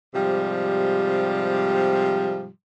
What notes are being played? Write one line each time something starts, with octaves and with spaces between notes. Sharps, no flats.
G#2 C3 F3 G3